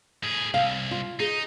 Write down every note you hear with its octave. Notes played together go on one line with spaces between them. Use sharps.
A2 G#4
C2 F5
F4
D#4 G#4